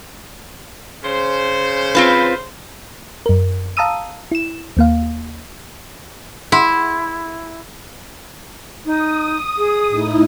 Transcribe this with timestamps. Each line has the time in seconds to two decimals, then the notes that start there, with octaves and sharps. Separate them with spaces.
1.04 C#3 C5
1.95 C4 F4 B4
3.26 F#2 A#4
3.77 F5 A5 A#5 D#6 E6 D#7
4.31 E4 E7
4.77 D#2 A#3 F5
6.52 E4 G#4 F#5 C6
8.85 D#4 D#6
9.57 G#4
9.88 A2 D#4 E4